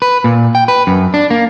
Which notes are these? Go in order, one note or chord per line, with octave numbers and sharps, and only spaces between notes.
B4
A#2
G5
B4
F#2
D4
A#3